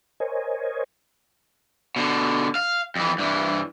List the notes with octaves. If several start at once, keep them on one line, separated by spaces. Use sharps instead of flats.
A#4 C5 C#5 D#5 G#5
B2 D3
F5
F2 E3
G2 E3